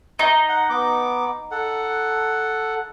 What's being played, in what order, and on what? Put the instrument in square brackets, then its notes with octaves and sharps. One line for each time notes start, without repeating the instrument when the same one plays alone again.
[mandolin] D#4
[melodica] F#5
B3 D6
A4 F#5